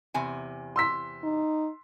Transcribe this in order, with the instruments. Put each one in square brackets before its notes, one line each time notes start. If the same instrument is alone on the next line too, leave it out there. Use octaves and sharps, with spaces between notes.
[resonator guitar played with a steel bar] E2 C3 G#5
[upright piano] C6 E6 B6
[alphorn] D#4